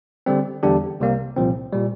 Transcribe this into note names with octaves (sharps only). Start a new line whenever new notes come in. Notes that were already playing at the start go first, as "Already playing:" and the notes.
D3 G3 C4
E2 D3 G3 D4 G4
C2 C3 G3 A#3
C2 A#2 F3 C4
A#2 G3